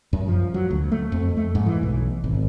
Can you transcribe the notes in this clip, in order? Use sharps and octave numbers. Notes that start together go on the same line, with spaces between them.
F#2
F3
F#3
D2
A3
F2
A3
G#2
E3
B1
G#1